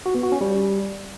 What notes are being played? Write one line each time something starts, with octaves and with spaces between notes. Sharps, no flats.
F#4
B3
F#4
C#4
G3